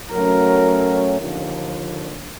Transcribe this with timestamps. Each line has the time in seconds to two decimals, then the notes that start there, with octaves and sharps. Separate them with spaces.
0.12 F#3 A3 C#4 A#4
1.20 D#2 D3 F3